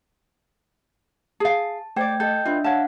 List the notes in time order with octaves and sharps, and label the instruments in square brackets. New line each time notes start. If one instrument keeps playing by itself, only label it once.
[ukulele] G#4 F5 [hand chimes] A5
[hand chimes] A3 G5 G#6 [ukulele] C5 D5
[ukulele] A4 [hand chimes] D#5 G5 G6
[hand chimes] D4 E5 [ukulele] F4 B4
[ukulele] C#5 A5 [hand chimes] F5 F#5